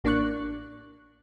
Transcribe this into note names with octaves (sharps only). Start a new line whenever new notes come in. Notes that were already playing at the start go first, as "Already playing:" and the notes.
A1 A#3 D4 D5 C#6 F#6